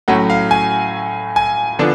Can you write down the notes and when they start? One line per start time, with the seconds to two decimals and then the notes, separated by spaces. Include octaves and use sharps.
0.08 A2 F#3 A3 C#4 F#5
0.30 F5
0.51 G#5
1.36 G#5
1.79 D3 F3 B3 D4